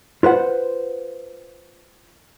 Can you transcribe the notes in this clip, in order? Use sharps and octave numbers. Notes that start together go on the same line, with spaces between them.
F4 B4 C5 F#5